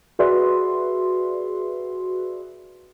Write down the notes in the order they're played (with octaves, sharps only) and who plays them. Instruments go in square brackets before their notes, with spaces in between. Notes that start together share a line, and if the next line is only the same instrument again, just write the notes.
[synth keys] F#4 G#4 B4 D5 E5 C6